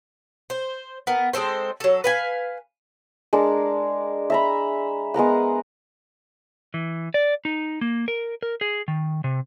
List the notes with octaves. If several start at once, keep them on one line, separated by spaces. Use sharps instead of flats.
C5
B3 A#4
G#3 C4 A4 C5
F#3 A4
B4 F5 G#5
G#3 D4 A#4
E5 A#5 B5
G#3 B3 A#4 F#5
E3
D5
D#4
A#3
A#4
A#4
G#4
D#3
C3